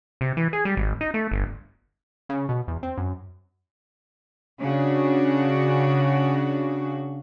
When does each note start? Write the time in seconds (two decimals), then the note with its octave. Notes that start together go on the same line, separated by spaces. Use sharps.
0.21 C3
0.37 E3
0.53 G#4
0.65 G3
0.77 G#1
1.01 D#4
1.14 A3
1.32 G1
2.29 C#3
2.49 B2
2.68 E2
2.83 C4
2.98 F#2
4.60 C#3 D4 F#4